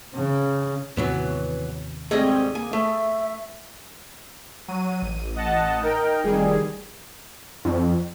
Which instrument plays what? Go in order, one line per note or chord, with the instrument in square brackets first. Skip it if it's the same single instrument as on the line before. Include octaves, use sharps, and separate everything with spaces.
[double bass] C#3
[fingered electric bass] D#2 A2 C3 [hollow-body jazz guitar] E3 F#3 B3
[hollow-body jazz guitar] G#2 G3 A3 [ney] C4 [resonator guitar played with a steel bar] G#4 D#5
[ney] A#3 [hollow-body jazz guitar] G#5
[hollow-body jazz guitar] A3 [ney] E5
[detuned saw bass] F#3 [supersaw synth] D#7
[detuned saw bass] A1
[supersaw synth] D#5 F#5 A5
D#4 A#4 G5
[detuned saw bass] F1 [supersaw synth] D#3 G3 G#4
[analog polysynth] F2